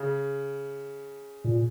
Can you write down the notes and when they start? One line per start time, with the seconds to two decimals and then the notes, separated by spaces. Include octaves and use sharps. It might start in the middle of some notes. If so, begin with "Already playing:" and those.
Already playing: C#3
1.44 A#2